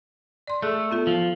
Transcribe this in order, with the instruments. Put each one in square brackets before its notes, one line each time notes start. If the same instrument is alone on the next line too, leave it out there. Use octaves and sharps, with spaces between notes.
[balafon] D5 C6
[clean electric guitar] A3 [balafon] G#4 A4
[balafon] B3 F4 A4
[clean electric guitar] F3